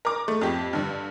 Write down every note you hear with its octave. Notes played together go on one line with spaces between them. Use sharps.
A#4 D6
A3
F2 G4
G2 D3